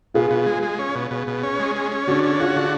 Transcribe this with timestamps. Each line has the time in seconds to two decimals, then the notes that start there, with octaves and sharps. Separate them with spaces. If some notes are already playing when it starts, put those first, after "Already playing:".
0.14 B2 F4 G#4
0.31 B2
0.47 G#3
0.63 G#3
0.79 C#4
0.95 B2
1.11 B2
1.27 B2
1.43 C#4
1.59 G#3
1.75 C#4
1.91 C#4
2.08 D3 D4 F#4
2.24 C#4
2.40 F4 F#4 G#4
2.56 D3